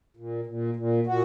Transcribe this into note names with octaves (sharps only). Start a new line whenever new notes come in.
A#2
A#2
A#2
A#2 F#4